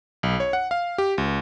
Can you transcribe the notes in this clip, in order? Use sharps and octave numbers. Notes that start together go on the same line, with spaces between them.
B1
C#5
F#5
F5
G4
C#2